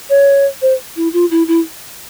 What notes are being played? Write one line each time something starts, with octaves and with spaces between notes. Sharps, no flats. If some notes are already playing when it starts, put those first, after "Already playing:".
C#5
C5
E4
F4
E4
E4